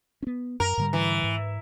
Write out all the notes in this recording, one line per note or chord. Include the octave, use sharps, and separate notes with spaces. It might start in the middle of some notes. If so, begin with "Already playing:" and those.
B3 C#4
F#2 A#4
G#2 D3 G3
E3
G#2